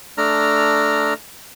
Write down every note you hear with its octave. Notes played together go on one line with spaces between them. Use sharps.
A3 D4 A#5 F6